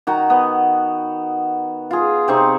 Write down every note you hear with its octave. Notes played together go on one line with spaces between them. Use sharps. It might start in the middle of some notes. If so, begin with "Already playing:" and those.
D#3 F#4 A#5
B3
F4 G#4
C3 C4 D#4 C#6